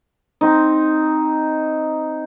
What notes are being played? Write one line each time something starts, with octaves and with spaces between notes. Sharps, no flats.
C4 D#4